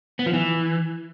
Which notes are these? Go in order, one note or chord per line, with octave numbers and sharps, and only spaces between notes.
B3
F3
E3